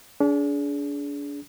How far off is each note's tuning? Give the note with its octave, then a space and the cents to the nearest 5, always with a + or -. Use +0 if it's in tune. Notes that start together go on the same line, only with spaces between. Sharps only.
D4 -35 G#4 +20